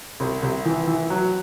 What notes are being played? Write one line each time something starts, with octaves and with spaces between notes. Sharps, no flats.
C2
C2
E3
E3
F#3